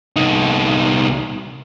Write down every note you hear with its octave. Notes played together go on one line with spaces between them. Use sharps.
C2 D#4